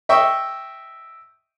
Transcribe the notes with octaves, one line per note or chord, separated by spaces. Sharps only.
D#5 E5 G5 C#6